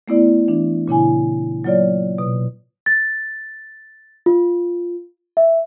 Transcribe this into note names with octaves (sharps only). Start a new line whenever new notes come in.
A3 B3 E4 D5
E3 D4
A#2 C#3 E4 G#5
F#3 A#3 F4 C#5 D5
B2
A6
F4
E5